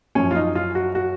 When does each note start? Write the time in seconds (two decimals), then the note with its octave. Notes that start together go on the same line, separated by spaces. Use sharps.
0.15 F#2 F3 C#4
0.31 F4
0.35 D#4
0.55 F4
0.75 F#4
0.95 F#4